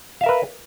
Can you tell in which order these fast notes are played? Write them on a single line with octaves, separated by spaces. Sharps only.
F5 E5 A#4 B4